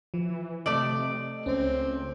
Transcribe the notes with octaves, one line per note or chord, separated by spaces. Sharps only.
E3 F3
C3 A3 D5 D#5
C#2 C4 C#4